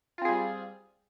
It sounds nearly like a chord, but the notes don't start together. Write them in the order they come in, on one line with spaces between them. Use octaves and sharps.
F4 C4 G#4 G3